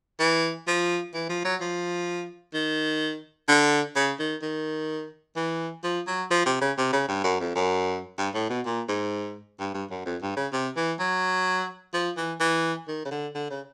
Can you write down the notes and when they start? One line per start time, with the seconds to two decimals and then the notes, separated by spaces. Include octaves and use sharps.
0.20 E3
0.67 F3
1.14 E3
1.29 F3
1.45 F#3
1.61 F3
2.54 D#3
3.49 D3
3.96 C#3
4.20 D#3
4.42 D#3
5.36 E3
5.84 F3
6.07 F#3
6.31 F3
6.46 C3
6.61 C#3
6.78 C3
6.93 C#3
7.08 G2
7.24 F#2
7.40 F2
7.56 F#2
8.18 G2
8.34 A2
8.50 B2
8.66 A#2
8.88 G#2
9.60 G2
9.74 G2
9.91 F#2
10.06 F2
10.22 G2
10.37 C#3
10.53 C3
10.76 E3
11.00 F#3
11.94 F3
12.17 E3
12.40 E3
12.88 D#3
13.05 C#3
13.11 D3
13.35 D3
13.50 C#3